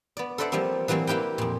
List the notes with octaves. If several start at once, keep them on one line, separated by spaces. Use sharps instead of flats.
B3 D5
A4 B4 C5 D5 E5 F#5
F3 G3 A#3 C4
E3 F#3 G3 A#3 C4
A#3 E4 G4 B4 G5
F2 A#2